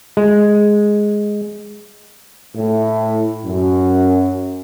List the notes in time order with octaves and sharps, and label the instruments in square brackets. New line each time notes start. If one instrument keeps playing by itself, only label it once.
[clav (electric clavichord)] G#3
[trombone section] A2
F#2